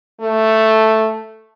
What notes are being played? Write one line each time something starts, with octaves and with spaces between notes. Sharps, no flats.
A3